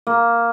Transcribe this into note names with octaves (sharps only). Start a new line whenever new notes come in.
A#3